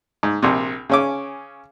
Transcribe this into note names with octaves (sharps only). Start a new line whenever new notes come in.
G#2
A#1 C3
C#3 C#4 D6